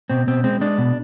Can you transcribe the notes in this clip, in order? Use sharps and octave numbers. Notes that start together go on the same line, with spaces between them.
B2 C4
B2 C4
G#3 C4
G#3 D4
B2